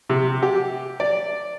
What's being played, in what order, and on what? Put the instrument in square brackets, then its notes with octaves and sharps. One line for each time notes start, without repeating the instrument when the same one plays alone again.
[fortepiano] C3
G4
D5